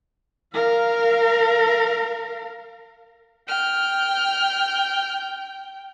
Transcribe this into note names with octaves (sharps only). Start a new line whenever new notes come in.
A#4 F5
G5 F6